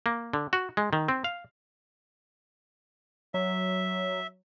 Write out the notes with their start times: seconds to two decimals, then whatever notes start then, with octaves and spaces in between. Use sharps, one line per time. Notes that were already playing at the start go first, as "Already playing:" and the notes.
0.06 A#3
0.33 D3
0.53 F#4
0.77 G#3
0.93 D#3
1.08 C4
1.24 F5
3.34 F#3 E5